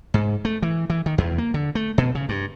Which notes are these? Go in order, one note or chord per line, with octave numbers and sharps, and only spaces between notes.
G#2
A3
E3
E3
D#3
E2
A#3
D3
A3
B2
C#3
G2